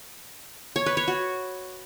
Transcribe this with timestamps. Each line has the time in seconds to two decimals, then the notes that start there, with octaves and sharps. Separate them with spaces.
0.76 C#5
0.86 B4
0.97 C#5
1.08 F#4